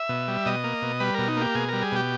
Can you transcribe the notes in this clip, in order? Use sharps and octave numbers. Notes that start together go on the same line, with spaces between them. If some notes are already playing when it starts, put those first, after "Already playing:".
Already playing: E5
B2
G3
B2 D#5
A#3
B2
G3 B4
B2 A#4
D#4
A#3 G4
B2 G#4
G3 A#4
G#4
B2 G4